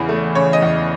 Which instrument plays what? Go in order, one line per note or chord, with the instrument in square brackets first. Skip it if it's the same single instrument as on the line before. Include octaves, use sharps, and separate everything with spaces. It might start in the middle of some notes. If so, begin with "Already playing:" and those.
Already playing: [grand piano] E2 C#3 E3
A3
C#3 C#5
D#5
E2